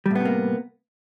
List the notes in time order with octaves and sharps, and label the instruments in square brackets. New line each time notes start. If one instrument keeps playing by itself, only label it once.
[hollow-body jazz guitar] G3
A2
B3
C3
A#3